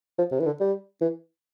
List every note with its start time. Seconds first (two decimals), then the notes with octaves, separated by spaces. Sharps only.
0.18 F3
0.32 C3
0.40 E3
0.46 D3
0.60 G3
1.02 E3